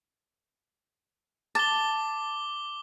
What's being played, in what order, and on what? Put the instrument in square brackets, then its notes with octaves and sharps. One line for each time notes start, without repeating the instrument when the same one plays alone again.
[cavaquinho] A5 [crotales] D6 G7